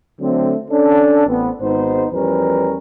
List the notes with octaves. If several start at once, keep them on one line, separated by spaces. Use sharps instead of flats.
D3 F#3 A3 C4
C#4 D4 A4
A1 B3 C4
G#1 G#2 B3 D#4 C5
E2 F3 G3 C#4 A#4 B4